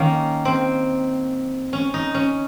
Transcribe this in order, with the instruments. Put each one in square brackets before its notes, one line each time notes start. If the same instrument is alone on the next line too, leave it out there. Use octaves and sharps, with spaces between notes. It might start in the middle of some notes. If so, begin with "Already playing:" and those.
Already playing: [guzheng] D#3 A#3 C#4
C4
C#4
D#4
C#4